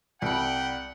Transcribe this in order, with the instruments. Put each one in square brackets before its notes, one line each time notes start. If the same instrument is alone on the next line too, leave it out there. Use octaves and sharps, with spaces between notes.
[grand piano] C2 [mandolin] D5 B5 [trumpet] F#5 [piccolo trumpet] G5